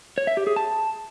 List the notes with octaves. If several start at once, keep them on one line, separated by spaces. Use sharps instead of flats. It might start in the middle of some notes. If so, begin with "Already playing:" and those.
C#5
E5
G4
G#4
A5